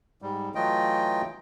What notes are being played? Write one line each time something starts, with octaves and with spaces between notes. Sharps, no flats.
G#2 G3
E3 F#3 A3 F4 D#5 G5